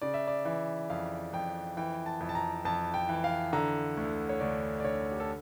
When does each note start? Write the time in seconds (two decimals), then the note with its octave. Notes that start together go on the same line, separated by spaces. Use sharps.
0.02 C#3 D5
0.14 E5
0.28 D5
0.45 E3 E5
0.90 F2 F5
1.33 F2 G5
1.77 E3 G5
2.06 A5
2.20 F2
2.29 A5
2.35 A#5
2.65 F2 A5
2.94 G5
3.09 E3
3.24 F5
3.53 D3 A#5
3.97 D2
4.29 C#5
4.40 D2 D5
4.80 D5
4.84 D3 C#5
5.12 G4
5.20 A4